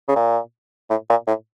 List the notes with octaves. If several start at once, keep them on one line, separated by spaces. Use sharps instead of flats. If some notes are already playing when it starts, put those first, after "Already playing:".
C#3
A#2
A2
A#2
A2